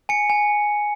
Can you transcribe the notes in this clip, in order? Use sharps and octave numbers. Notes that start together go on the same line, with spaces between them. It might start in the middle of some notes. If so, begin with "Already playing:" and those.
G#5 C#7
G#5